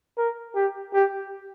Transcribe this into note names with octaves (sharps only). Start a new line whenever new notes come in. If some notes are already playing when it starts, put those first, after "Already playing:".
A#4
G4
G4